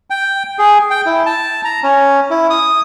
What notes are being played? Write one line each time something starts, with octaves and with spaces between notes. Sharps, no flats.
G5
G#4
G5
E4
A5
A#5
C#4
E4
D#6